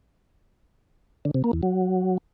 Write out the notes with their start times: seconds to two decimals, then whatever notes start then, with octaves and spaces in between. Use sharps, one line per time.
1.25 D3
1.35 C3
1.44 A#3
1.53 E2
1.63 F#3